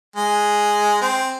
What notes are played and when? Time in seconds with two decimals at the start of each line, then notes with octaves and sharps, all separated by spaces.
0.16 G#3
1.01 C4